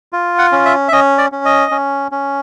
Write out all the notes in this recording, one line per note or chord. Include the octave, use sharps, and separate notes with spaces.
F4
F#5
C#4
E5
E5
C#4 D#5
D5
C#4
D#5
C#4
C#4